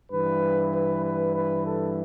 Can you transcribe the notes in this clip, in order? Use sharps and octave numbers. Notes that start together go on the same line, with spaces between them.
G2 E3 B4
B4
B4
B4
A4